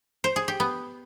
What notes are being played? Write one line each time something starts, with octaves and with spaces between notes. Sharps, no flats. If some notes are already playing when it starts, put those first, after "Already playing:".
C5
G#4
G4
B3